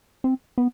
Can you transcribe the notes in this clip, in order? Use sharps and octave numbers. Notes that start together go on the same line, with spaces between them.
C4
B3